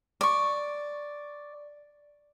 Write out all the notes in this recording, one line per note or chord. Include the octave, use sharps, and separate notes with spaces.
D5 C#6